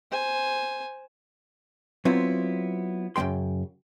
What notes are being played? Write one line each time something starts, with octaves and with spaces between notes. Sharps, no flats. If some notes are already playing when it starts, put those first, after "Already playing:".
C5 G#5
F#3 B3 C4 E4 F4
F#2 C#3 G#3 G5 C6